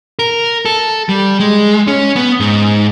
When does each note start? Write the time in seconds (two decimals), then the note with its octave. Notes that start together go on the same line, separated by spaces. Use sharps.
0.19 A#4
0.65 A4
1.09 G3
1.40 G#3
1.88 C#4
2.16 B3
2.40 G#2